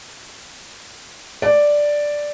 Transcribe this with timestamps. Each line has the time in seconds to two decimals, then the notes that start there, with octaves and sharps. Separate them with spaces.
1.42 D5